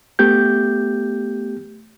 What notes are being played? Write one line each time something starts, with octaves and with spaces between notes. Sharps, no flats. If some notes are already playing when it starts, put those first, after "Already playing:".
A3 B3 G4 G6